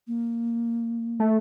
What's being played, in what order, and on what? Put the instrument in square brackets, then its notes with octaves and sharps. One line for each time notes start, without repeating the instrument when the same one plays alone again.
[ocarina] A#3
[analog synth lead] A3